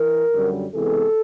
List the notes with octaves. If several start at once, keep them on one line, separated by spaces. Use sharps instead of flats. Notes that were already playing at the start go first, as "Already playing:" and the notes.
Already playing: E3 A#4
F#2 D3 G3
C3 E3 G#3 B3 A4